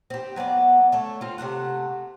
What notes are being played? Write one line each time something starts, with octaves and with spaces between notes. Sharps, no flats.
C4 G4
F#3 B3 C5 D5
A3 A4 C#5
C4 F4
C3 A3 C4 F#5